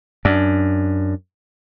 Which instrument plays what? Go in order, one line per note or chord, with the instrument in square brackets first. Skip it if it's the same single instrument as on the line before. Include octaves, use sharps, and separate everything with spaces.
[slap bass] F#2 [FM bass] D4